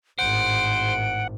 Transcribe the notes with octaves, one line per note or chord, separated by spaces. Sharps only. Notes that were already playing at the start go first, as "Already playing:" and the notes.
G#1 A2 C5 F#5 D7